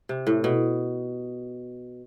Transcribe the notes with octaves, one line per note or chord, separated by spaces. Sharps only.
C3
A2
B2